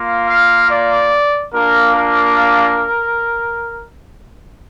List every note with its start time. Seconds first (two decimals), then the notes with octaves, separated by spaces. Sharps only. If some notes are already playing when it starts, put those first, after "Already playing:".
Already playing: A#3 F4
0.28 F5
0.70 D5
1.54 A#3 D4 F4 A#4
1.96 A#4